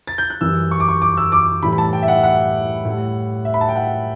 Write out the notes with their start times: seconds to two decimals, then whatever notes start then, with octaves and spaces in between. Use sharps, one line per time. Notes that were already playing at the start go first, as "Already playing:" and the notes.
0.07 A6
0.18 G6
0.30 F#6
0.41 F#2 E3 G3 E6
0.71 C#6
0.80 D6
0.88 C#6
1.02 D6
1.17 E6
1.32 D6
1.63 A2 E3 G3 B5
1.73 B5
1.78 A5
1.93 G5
2.03 E5
2.08 F#5
2.23 F#5
2.85 A2 G3
3.45 E5
3.54 B5
3.61 A5
3.69 G5
3.75 F#5